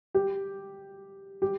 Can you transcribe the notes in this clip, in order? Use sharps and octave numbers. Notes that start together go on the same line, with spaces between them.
G4
G4